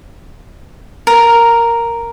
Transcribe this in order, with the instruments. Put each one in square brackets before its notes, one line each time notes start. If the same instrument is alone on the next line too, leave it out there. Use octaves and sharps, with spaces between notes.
[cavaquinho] A#4